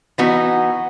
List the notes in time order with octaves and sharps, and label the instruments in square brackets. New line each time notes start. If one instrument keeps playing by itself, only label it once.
[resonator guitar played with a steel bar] E3 B3 D#4 F#4